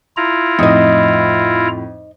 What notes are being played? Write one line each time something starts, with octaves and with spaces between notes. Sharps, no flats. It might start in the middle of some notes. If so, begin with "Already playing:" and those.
E4 F4 A#5
F2 A2 D#4 D#5